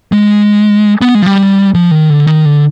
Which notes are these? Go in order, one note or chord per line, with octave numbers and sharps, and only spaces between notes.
G#3
B3
G#3
F3
G3
F3
D#3
D3
D#3
D3